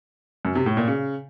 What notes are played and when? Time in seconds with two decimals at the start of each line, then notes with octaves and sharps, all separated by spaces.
0.45 F#2
0.55 C3
0.66 A2
0.77 A#2
0.88 C#3